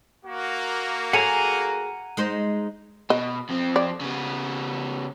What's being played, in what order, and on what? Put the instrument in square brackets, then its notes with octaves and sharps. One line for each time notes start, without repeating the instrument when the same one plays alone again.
[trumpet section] A#3 F#4
[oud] G#4 A4 C#5 [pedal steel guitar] F#5 G#5 A#5
[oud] G#3 D#4 C5
[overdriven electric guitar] B2 [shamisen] D#5
[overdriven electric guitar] F2 C4
[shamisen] D5
[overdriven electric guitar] C#3 B3